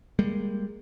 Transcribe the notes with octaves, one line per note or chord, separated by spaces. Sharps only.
G3 G#3 A#3